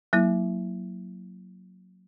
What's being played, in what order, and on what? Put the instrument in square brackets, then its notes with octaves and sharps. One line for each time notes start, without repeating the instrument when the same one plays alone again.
[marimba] F#3 A#3 E4